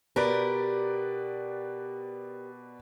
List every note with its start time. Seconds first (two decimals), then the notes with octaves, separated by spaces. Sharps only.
0.16 B2 G4 A#4 B4 D5